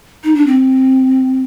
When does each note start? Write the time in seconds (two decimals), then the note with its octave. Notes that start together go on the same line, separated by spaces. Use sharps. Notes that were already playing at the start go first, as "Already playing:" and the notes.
0.24 D#4
0.35 D4
0.47 C4